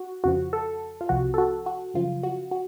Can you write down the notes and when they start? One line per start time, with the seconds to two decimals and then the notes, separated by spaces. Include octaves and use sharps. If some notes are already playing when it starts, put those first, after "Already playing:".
Already playing: F#4
0.24 F2 C#3 F3 F#4
0.53 A4
1.01 F4
1.09 C2 C3 F3 F#4
1.34 A4
1.38 F#4
1.66 F#4
1.94 F#2 C#3 F3 F4
2.23 F#4
2.51 F#4